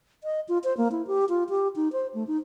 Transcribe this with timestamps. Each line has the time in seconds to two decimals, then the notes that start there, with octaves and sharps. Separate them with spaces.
0.24 D#5
0.48 F4
0.64 C5
0.77 A#3
0.91 E4
1.07 G4
1.29 F4
1.49 G4
1.76 D#4
1.92 C5
2.14 A3
2.27 D#4